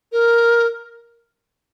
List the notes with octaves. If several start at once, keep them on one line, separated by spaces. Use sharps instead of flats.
A#4